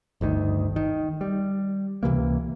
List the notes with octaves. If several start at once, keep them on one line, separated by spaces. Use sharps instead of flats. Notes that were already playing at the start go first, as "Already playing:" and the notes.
G1 D2 D#3
D#3
G3
C#2 C3 E3 A#3